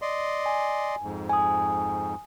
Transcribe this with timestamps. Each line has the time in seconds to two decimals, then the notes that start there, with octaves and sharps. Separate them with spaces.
0.02 D5 D#5 C6
0.46 G#5
1.03 F2 G#2
1.30 G#5 D#6